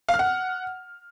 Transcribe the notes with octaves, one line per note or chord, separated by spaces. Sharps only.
F5
F6
F#5